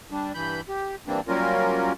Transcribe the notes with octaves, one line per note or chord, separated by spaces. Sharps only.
G3 D4
G2 E3 B5 G6
G4
E3 G3 A#3 C4 D4
F#3 G3 A#3 C#4 F4 A#4